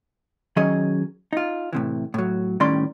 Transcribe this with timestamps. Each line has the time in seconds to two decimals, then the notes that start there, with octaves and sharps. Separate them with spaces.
0.56 D#3 F#3 C#4 G#4 D#5
1.33 D#4 F4
1.73 A2 C3 E3
2.14 A2 F#3
2.60 A2 D#3 G3 C#4 D5 C6